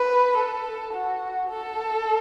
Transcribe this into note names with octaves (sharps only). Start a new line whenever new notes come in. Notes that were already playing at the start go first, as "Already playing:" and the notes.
Already playing: B4
A4
F#4
A4